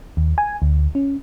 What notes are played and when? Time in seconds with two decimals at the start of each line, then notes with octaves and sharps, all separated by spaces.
0.17 D#2
0.38 G#5
0.62 D2
0.95 C#4